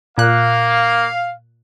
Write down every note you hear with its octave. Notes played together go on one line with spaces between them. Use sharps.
A#2 A#3 F5 F#6